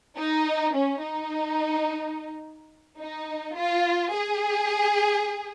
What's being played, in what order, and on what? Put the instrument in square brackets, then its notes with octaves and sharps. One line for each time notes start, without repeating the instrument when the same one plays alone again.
[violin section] D#4
C#4
D#4
D#4
F4
G#4